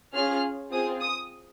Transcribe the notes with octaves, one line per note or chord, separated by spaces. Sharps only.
C#4 F4 G#4 F6
C4 F4 G#4 D#6
D#6